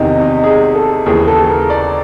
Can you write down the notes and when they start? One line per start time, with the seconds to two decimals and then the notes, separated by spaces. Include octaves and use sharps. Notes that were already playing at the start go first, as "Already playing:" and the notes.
Already playing: E2 C3 D#3 D#4
0.22 D#4
0.44 G#4
0.75 A4
1.06 D#2 C#3 E3 G#4
1.28 A4
1.50 A#4
1.70 D5